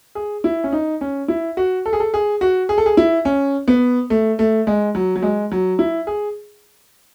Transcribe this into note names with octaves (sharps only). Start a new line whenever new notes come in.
G#4
E4
C#4
D#4
C#4
E4
F#4
A4
G#4
A4
G#4
F#4
G#4
A4
G#4
E4
C#4
B3
A3
A3
G#3
F#3
F#3
G#3
F#3
E4
G#4